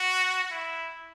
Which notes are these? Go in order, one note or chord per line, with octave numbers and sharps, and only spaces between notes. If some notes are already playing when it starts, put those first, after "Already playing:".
Already playing: F#4
E4